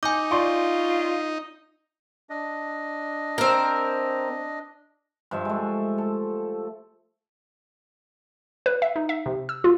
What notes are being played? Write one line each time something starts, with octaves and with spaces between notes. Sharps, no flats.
D#4 G#5 D6 G6
F4 D5 C6 C#6
D4 D#5
C4 A#4
G2 F3 E5
G#3 A3
A4
B4
E5
D#4
E5
C3
E6
F4